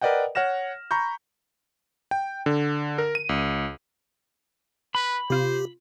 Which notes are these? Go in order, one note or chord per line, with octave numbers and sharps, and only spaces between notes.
A#4 B4 D5 D#5 F#5 G5
C#5 F#5 F6 A#6 E7
A#5 B5 C#6 G6
G5
D3
A#4
D#7
C#2
B4 B5
C3 F4 G4 C5